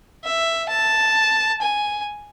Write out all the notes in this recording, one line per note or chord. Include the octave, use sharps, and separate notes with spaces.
E5
A5
G#5